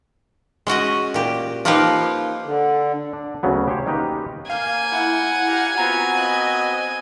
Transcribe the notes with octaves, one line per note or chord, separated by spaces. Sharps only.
G#3 C#4 F#4 D#5
A#2 G4
F3 A#3 D#4 F4 G4 B4
D3
D4
D2 C#3 F#3 B3
G4 C5 C#5
D#3 A#3 C#4 D#4 G4 B4
A#3 F5 G#5 G6
E4 F#5
G4 F5 A#5
B3 C4 F4 F#4 A#5
D#5 F#6